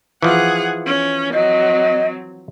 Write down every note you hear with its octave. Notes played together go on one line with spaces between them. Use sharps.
E3 F3 G#4 F#5
C#4
F#3 C4 D#5